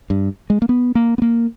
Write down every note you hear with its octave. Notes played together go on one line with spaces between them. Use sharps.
G2
G#3
A#3
B3
A#3
B3
A#3